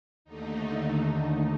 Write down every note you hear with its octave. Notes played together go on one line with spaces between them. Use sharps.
D#2 D3 A3 D#4